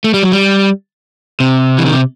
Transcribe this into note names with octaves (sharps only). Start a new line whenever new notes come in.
A3
G3
F#3
G3
C3
E3
D#3
C3